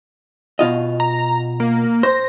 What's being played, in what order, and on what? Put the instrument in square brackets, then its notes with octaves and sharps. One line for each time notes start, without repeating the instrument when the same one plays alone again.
[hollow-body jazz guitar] B2 F4 D#5
[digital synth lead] A#5
A#3
[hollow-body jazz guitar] C5 [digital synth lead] A#6